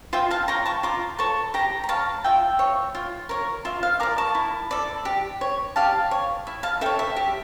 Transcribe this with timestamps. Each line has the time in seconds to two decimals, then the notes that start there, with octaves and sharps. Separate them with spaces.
0.13 F4 E5 G5
0.31 F5 A5
0.48 C#5 G5 A#5
0.66 A5 C#6
0.83 F4 A#5 D6
1.19 A4 C#5 A5 C#6
1.54 G4 G5 A#5
1.84 A#5
1.89 C#5 F5 A5
2.24 F4 E5 G5
2.59 C#5
2.95 F4
3.29 A#4 C#5
3.65 F4 E5
3.83 F5
4.00 A#4 D5 A#5 D6
4.18 A5 C#6
4.35 E4
4.71 A4 D5
5.05 G4
5.41 C#5
5.76 G4 F5 A5
6.11 C#5
6.47 E4
6.63 F5 A5
6.81 A4 E5 G5
6.86 C#5
6.99 E5
7.16 G4